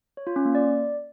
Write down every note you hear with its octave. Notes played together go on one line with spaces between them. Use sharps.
C#5
F4
C#4
A#3
D5